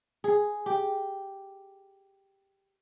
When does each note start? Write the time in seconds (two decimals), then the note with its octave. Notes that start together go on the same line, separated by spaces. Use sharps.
0.24 G#4
0.66 G4